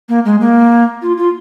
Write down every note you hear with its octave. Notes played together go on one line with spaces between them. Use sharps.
A#3
G#3
A#3
F4
F4